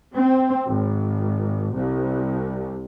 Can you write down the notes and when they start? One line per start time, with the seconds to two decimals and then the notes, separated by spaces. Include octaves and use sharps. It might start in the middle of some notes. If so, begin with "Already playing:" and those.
0.15 C4
0.68 G#1
1.76 C2